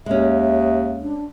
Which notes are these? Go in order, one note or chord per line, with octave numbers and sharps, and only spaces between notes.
D#2 G#3 C#4 E5
D4